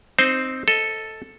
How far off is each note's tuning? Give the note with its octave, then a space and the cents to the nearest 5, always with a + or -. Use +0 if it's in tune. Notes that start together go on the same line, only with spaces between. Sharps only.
C4 +0 D#4 -5 C5 +0
A4 +0 D#5 +20